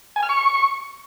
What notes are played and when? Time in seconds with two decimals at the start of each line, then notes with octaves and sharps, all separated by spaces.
0.16 G#5
0.23 F6
0.29 C#6